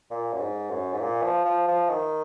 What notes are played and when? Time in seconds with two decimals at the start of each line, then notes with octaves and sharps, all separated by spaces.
0.11 A#2
0.33 F#2
0.40 G#2
0.70 F#2
0.93 G#2
1.01 A#2
1.23 F3
1.45 F3
1.68 F3
1.90 D#3